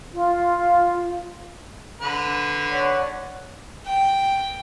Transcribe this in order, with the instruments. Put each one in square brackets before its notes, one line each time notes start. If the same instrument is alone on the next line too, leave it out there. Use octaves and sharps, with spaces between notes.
[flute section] F4
[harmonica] D3 B4
[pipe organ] C#5 D5 F#5
[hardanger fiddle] G5